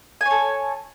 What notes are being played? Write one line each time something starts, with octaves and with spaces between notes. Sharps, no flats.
A4 C#5 G#5